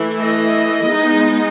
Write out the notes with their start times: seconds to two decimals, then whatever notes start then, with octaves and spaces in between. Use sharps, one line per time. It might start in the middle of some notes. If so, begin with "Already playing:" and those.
Already playing: E3 A3 E4
0.20 D#5
0.89 G#3 B3 D#4